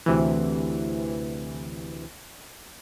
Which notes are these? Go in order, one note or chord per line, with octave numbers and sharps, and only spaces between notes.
D2 C3 E3